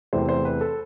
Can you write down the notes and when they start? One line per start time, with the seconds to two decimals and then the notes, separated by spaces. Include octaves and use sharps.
0.13 E2 C3 E3 A3 C5
0.29 C5
0.45 B4
0.61 A4